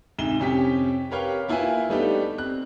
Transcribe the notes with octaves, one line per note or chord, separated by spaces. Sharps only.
D2 G#2 C3 E7 G7
F2 C3 C#4 G4 G5 B6
G4 A#4 B4 C#5 F5 G5
A#3 E4 F4 B4 E5 G#5
G3 A3 B3 D4 D#4 G4
C4 F#6